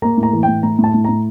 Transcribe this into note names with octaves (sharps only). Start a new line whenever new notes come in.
A#3 A#5
A2
A#5
E3
G5
A2
A2 A#5
A2
A5
A2
A2 A#5